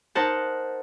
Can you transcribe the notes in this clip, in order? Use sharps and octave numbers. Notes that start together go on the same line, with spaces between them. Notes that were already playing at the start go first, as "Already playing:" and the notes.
D#4 A#4 C5 F#5 A5